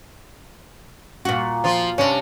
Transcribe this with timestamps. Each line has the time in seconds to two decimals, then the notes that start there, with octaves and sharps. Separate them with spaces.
1.25 A#2 F#4
1.64 F3 F4
1.98 C3 C#4 D4